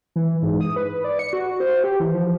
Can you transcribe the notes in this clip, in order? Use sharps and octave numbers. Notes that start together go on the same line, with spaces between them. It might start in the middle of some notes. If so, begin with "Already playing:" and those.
E3
G#2
D#6
B4
D5
C#7
F#4
C5
G4
E3
F3